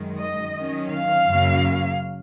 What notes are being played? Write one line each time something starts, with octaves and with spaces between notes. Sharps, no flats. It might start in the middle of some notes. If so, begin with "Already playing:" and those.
Already playing: F#2 D#3 G#3
D#5
D#3 F#3 C#4
F5
F#2 C#3 F#3 A#3 C#4